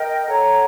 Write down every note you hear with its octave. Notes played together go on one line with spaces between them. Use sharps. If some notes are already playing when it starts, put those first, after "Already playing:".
Already playing: A#4 D#5 G5
A4 C#5 F#5 A#5